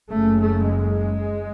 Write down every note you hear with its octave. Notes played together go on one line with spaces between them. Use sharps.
F#1 F#2 C#3 A3
A3
G#3